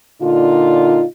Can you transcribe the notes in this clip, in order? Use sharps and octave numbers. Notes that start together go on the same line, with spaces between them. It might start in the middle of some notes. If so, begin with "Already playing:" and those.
A#2 D3 D#4 F4